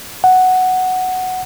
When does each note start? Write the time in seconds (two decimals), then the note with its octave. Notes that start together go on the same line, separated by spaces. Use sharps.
0.24 F#5